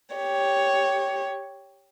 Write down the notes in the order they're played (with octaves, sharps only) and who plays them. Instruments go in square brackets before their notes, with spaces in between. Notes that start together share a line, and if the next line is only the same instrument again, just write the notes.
[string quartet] G4 C#5